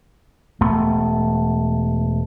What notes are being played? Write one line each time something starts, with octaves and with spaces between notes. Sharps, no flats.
E1 A3 B3